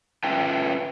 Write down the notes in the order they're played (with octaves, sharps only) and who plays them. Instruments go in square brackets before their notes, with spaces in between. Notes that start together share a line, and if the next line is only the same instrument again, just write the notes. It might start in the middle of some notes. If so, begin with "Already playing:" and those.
[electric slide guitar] C#4 F4 B4 E5 G5 A5